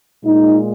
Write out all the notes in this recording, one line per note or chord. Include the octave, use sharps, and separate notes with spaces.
A#2 G#3 D#4